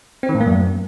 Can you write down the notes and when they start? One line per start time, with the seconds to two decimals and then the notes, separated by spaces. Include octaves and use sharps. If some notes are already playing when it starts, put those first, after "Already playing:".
0.23 C4
0.29 D#3
0.35 A2
0.41 A#3
0.46 F#2